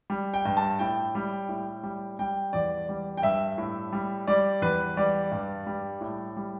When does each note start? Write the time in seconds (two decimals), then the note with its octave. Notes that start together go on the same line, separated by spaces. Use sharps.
0.10 G3
0.34 G5
0.45 G2
0.57 A5
0.79 A2 G5
1.15 G3
1.49 A2
1.83 G3
2.19 G3 G5
2.53 E2 D5
2.89 G3
3.17 G5
3.22 G2 E5
3.58 A2
3.92 G3
4.28 G3 D5
4.62 E2 B4
4.97 G3 D5
5.32 G2
5.67 G3
6.01 A2
6.37 G3